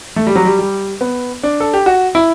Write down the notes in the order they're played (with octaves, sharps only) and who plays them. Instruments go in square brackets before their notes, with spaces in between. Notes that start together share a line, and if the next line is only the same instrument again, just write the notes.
[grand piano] A3
G3
F#3
G3
G3
B3
D4
A4
G4
F#4
E4